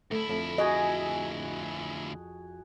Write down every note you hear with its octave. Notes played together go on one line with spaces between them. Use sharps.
D2 A3 E4
F2
F#4 G#4 D#5 G#5